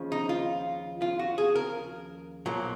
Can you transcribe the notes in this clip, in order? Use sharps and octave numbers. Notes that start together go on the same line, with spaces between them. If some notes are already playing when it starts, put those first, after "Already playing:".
Already playing: D#2 C#3 F3
D#4
F4
F4
F#4
G#4
A#4
B1 A#2 F#3